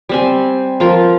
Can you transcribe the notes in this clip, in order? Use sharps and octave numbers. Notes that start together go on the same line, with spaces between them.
G3 C4 G#5
F3 F4 A#4